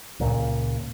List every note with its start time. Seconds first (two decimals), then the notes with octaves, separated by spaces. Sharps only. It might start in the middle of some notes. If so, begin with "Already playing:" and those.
0.20 C#2 A#2